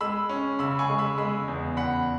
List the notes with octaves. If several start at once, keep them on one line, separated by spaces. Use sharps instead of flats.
G#3 B5 E6
C#4
C#3 B5 E6
G#5 C#6
G#3
B5 E6
G#3 B5 E6
E2
E2 F#5 B5